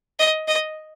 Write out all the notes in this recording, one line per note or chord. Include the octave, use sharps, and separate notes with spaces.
D#5
D#5